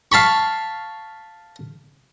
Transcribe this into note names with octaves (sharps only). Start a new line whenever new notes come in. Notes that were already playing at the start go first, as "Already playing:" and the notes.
F5 A5 B5 C#6